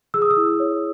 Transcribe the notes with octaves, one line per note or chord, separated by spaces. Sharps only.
G#4 E6
D#6
E6
E4
C#5